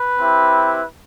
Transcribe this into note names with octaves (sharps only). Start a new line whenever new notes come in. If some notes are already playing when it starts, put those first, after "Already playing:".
Already playing: B4
C4 E4 G4